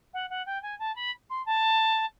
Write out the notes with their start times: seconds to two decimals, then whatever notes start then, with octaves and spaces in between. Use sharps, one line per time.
0.13 F#5
0.30 F#5
0.46 G5
0.62 G#5
0.79 A5
0.95 B5
1.29 C6
1.45 A5